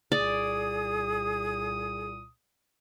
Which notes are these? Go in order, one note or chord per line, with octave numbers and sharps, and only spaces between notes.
C2 A#2 G#4 D5 D#6